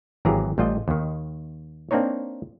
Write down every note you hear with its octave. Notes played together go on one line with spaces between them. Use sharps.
G#1 E3 F#3 G4 G#4 A#5
A1 G3 F4 D#5
D#2 D#3
A#3 C4 D4 D#4 C#5